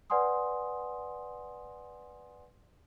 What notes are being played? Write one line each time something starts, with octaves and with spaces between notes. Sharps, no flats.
B4 D5 F#5 G#5 C6 D#6